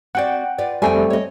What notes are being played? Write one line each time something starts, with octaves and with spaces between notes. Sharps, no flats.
C4 F#4 D5 F#5 G5
F4 B4 D5
F2 G3 A3 C4 G5 G#5
C#5 D#5